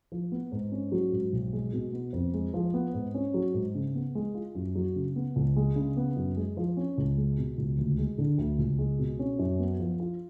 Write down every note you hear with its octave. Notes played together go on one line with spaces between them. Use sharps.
F3
B3
G#2
C#4
F#3
G#2
B1
G#3
B2
B3
F2
G#3
F3
B3
G#2
C#4
F#3
G#2
C#3
B3
G#3
F4
F#2
F#3
C#3
B3
C#2
G#3
C#3
B3
F#2
G#3
F3
C#4
C#2
G#3
B2
C#2
D2
G#3
D3
D2
C#2
G#3
B2
C#4
F#2
B3
F3
F4